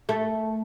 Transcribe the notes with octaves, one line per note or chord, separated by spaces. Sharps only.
A3